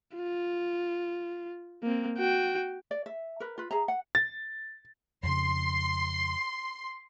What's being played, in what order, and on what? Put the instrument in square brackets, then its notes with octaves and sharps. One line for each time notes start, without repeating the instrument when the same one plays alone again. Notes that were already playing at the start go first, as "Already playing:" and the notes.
[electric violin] F4
A#3 C4
F#4 G5
[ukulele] D5
E5
A#4 B4
F4 B4
G#4 E5 A#5
F#5
[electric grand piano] A6
[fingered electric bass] F2 C#3 [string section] C6